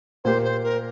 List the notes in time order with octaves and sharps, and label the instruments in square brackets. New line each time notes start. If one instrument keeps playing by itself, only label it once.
[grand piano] A#2 A#3 G4 [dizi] C5
[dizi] C5
A#4